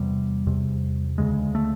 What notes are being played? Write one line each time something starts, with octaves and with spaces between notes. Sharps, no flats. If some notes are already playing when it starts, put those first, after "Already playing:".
Already playing: E2 C3 G3
E2 C3
D2 C#3 G#3
A3